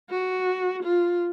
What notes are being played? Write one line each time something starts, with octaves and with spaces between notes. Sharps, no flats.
F#4
F4